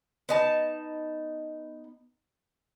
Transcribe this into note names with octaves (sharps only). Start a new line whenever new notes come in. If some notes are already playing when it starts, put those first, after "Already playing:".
B3 D#4 A5